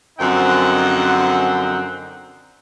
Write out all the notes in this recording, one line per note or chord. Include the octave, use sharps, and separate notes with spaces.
F#2 D3 F3 C4 D#4 F#5